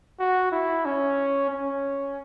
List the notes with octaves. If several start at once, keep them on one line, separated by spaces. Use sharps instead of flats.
F#4
E4
C#4
C#4